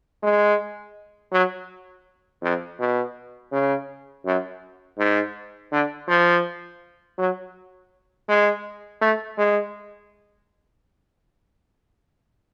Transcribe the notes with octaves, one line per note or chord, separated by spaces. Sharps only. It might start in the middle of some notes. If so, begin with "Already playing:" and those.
G#3
F#3
F2
B2
C#3
F#2
G#2
D3
F3
F#3
G#3
A3
G#3